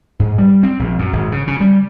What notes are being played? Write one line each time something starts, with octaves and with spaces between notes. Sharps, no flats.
G#2
G3
C4
A#1
F#2
G#1
C#3
C#3
G3